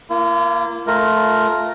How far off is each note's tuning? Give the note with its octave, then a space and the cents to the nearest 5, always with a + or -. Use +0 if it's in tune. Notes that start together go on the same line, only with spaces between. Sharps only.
A#3 +0 F4 -45
A3 -15 F4 +0 A#4 +0